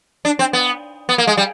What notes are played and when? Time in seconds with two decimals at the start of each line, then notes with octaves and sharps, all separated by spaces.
0.25 D4
0.39 C4
0.53 B3
1.09 B3
1.18 A#3
1.27 G#3
1.37 G3